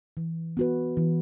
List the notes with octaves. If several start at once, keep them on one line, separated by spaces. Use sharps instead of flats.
E3
B3 F#4 B4
E3